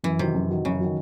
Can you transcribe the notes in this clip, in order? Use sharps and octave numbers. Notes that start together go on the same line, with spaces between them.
F#2 E3
C3 D#3 F#3
F#2
D#3 F#3
F#2 C#3
D#3 F#3